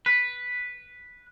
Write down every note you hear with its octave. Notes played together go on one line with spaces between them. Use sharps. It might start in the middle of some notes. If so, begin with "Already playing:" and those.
B4